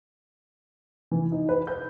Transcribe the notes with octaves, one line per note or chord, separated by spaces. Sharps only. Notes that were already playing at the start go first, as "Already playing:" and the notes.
E3
D#4
B4
G6